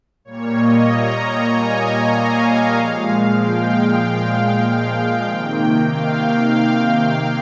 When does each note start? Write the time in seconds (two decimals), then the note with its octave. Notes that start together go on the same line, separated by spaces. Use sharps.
0.25 A#2 G3 A#3 C#5
0.55 D#5
0.87 A#5
1.50 G#5
2.13 F5
2.76 A#2 F3 G#3
3.38 G5
5.25 C3 D#3 A#3
5.88 F5